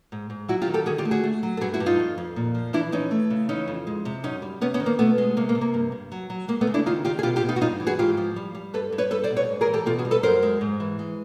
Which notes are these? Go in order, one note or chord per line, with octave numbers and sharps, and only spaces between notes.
G#2
G#2
F#3 E4 F#4
F4 G4
D#3
G4 A4
D3 F#4 G#4
F4 G4
A3
F#4 G#4
A3
F#3
A4
G2 F#4 G#4
E4 F#4
G2
D#4 F4
F2
F2
A#2
F3
E3 D4 E4
E3 C#4 D#4
A3
C#3
E3 C#4 D#4
F2
G#3
C3
F#2 C#4 D#4
G3
C3 B3 C#4
B3 C#4
D#3
A#3
B2 A3 B3
G#3
C3 A#3
A#3
C3
A#3
G2
G2
F#3
F#3
G#3 A#3
A3 B3
C#3
D4 E4
D#3 D#4 F4
D#3 F4 G4
G#4
B2 F4 G4
F4 G4
B2
D#4 F4
F#4
G2 D#4 F4
E3
F#4 G#4
G#2 F4 G4
F3
G3
G3
G2 A4 B4
G2
B4 C#5
G3 A4 B4
C5 D5
B2
B4 C#5
G#2
G#4 A#4
E3
G4 A4
B2 F4 G4
F#4 G#4
G3
A4 B4
F#2 A#4 C5
G#3
G#2
E3
G#3